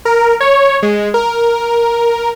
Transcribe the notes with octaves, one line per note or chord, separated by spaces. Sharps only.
A#4
C#5
G#3
A#4